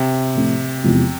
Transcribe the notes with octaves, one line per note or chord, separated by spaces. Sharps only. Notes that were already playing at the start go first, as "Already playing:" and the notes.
Already playing: C3
A2 F3 A3 C4
E2 C3 F3 G#3